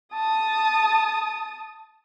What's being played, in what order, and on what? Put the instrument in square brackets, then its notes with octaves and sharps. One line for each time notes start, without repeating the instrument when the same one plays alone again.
[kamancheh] A5 D#6